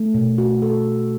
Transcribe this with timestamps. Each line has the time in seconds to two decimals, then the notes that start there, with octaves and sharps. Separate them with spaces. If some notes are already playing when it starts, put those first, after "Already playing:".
Already playing: A3
0.14 B2
0.38 F#4
0.62 A4